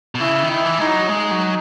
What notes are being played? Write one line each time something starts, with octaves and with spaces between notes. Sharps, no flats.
B2
C#3 E4
D#3
E4
E3
G#3 D#4
F#3
G#3 D#4
F#3